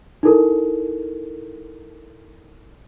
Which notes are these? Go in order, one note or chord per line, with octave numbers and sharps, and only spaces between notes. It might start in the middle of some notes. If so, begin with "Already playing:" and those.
D#4 E4 A4 A#4